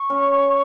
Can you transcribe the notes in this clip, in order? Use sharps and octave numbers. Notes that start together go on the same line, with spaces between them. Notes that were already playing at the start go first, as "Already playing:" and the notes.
Already playing: C#6
C#4